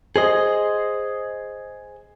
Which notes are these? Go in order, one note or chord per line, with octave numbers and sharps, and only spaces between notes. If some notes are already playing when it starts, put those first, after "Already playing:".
G#4 C5 D#5